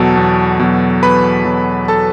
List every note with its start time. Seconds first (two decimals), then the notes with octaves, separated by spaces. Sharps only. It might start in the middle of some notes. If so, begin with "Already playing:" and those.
Already playing: E2 B2 F#3 A4 A5
0.17 E2
0.59 B2 F#3
1.03 E2 B4 B5
1.45 B2 F#3
1.88 A4 A5